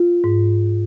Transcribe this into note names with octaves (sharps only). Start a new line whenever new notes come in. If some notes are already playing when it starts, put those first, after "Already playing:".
Already playing: F4
G#2